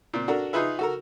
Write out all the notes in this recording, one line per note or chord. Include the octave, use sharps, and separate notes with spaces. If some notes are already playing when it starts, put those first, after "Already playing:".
A#2 C4
D4 F#4 A4 A#4
D#4 F4 G#4 B4 E5
F#4 A4 A#4